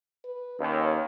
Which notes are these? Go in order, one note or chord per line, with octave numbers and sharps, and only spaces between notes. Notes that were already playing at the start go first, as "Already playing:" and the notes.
B4
D#2 C#4